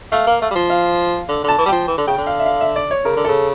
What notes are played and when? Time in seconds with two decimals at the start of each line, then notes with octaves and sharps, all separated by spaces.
0.12 A3 F5
0.27 A#3
0.42 A3
0.51 G3
0.55 F3
0.70 F5
1.29 D3
1.44 D3 A5
1.58 E3
1.66 G3
1.68 F3 G5
1.88 E3
1.98 D3
2.07 C#3 G5
2.18 D3
2.27 F5
2.39 E5
2.46 F5
2.61 E5
2.76 D5
2.91 C#5
3.05 C#3 A#4
3.16 D3
3.25 C#3 A4